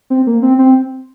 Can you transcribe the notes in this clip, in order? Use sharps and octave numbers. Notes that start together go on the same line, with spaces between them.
C4
A#3
C4
C4